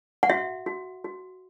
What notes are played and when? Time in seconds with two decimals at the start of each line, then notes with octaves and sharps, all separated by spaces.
0.23 F#5
0.30 F#4 E5
0.66 F#4
1.04 F#4